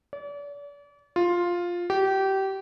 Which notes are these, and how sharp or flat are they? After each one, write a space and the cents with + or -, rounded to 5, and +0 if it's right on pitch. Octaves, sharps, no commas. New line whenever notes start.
D5 -40
F4 +5
G4 -25